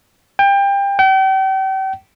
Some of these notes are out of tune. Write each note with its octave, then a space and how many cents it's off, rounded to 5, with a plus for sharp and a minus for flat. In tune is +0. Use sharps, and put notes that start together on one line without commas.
G5 +25
G5 -40